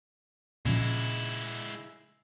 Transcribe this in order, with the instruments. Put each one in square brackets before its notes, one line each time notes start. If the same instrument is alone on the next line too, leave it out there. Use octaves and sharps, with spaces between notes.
[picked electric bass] A#2 C#3 F3 [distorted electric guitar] G#3 E4